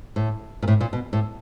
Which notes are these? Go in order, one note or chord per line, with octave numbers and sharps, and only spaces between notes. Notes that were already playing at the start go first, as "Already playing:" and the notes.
A2
A#2
A2
A#2
B2
A2